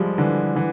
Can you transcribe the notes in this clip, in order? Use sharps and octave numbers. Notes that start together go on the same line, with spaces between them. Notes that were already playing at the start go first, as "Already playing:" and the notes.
Already playing: F3 G3 G#3
D3 E3
D3 E3